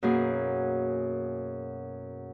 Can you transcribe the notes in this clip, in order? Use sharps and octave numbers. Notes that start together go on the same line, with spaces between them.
F#2 B2 A#3 G#4